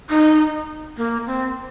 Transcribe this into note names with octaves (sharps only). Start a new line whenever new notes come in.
D#4
A#3
C4